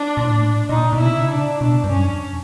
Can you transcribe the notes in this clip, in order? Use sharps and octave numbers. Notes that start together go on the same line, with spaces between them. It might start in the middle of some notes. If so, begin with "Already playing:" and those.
Already playing: D4
A#2
A2
A#2 D#4
B2
E4
C3
C#3
D4
B2 D4
G2
F#2 C#4
F2